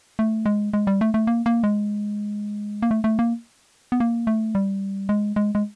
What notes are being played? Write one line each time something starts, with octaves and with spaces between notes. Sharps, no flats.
A3
G#3
G#3
G3
A3
A3
A#3
A#3
G#3
A#3
A3
A3
A#3
B3
A#3
A3
G3
G#3
G#3
G#3